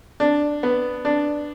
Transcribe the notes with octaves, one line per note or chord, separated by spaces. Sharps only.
D4
B3
D4